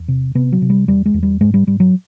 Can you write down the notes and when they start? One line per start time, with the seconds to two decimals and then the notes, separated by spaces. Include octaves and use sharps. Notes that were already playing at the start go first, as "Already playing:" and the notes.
Already playing: E2
0.08 C3
0.35 C3 B3
0.52 F#3
0.62 C3
0.70 G3
0.88 E2 G3
1.06 G#3
1.14 E2
1.23 G3
1.41 G#2 G#3
1.54 G3
1.67 G#2 G3
1.80 F#3